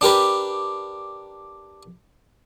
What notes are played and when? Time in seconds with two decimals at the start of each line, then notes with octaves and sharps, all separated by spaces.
0.01 D4 G4 A#4 B4